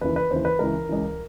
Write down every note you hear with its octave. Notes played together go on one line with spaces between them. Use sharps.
D#2 C#3 E3 B4
B4
D#2 C#3 E3 C5
B4
C#2 C#3 E3 A#4
C#2 C#3 E3